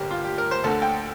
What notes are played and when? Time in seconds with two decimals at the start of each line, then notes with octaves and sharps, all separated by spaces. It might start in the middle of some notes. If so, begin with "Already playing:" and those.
Already playing: A1 G2 D3 G4 A#4 C5
0.11 F4
0.24 G4
0.38 A#4
0.51 C5
0.64 D2 D3 A4
0.82 G5